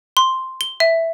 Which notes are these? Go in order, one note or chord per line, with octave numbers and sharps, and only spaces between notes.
C6
G7
E5